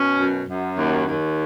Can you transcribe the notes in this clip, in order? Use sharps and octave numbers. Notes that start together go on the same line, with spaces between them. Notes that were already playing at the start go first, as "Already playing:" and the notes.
Already playing: B2 C#4
F#2
F#2
D#2
D#2